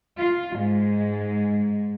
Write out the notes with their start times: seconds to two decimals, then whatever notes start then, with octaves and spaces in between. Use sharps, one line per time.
0.19 F4
0.55 G#2 G#3